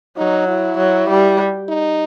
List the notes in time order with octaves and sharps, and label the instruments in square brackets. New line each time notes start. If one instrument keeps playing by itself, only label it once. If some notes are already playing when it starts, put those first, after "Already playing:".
[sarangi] F#3 [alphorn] D#4
[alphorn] E4
[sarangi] F#3
G3
[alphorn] D#4